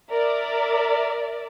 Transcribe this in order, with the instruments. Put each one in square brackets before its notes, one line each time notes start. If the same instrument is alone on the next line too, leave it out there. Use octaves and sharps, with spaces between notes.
[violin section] A#4 D5 E5